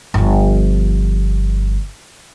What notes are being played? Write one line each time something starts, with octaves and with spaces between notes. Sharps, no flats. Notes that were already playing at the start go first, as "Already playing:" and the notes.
G1 F3